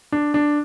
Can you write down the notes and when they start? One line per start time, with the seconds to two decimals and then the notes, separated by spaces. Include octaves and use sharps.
0.12 D4
0.34 D4